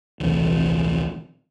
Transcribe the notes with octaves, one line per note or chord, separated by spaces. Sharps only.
D1 A#1 C3 E3